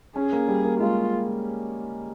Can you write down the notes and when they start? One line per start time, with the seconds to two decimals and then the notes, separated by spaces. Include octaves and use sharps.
0.16 C#4 G#4
0.32 A#3
0.48 G3
0.65 A#3
0.80 G#3 F4